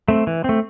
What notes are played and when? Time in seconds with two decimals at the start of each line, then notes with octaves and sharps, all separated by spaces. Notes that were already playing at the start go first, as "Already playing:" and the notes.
0.08 A3 C4
0.27 E3
0.44 A3 C4